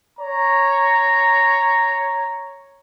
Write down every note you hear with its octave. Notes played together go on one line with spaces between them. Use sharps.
C#5 A#5